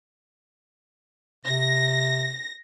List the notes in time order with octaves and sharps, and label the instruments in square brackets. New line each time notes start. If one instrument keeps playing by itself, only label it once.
[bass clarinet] C3 [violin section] A#6